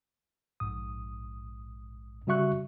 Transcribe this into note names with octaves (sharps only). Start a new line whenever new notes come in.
A#1 G#2 D#6
C#3 G3 F#4 E5 C#6 F#6